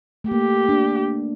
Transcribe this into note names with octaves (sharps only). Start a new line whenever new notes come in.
A3
A#3 G4
D4